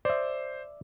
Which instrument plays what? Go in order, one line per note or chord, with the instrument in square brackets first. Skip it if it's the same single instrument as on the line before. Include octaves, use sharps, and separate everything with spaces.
[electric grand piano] C5 [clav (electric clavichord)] D5 E5